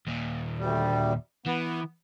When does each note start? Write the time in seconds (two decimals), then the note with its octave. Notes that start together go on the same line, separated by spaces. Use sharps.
0.07 D#2 A#2
0.58 D2 G3
1.46 E3 B3